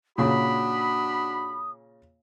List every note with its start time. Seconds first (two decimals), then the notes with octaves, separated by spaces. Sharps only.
0.18 A#2 C#3 D4 F#4 B5 D#6